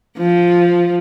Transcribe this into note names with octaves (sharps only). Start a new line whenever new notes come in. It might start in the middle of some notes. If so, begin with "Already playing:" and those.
F3